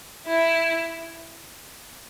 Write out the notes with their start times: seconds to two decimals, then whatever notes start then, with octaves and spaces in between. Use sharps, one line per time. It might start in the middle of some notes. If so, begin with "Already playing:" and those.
0.27 E4